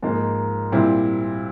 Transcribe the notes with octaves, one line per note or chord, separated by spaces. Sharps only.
G#2 F3 A#3 D#4
A#2 G3 C4 E4